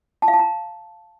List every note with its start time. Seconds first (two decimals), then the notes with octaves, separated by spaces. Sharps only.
0.22 A5
0.28 F5
0.33 A5
0.39 A#5